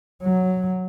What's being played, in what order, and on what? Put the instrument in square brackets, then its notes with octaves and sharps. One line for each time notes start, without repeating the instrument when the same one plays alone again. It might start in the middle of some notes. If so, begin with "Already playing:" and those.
[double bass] F#3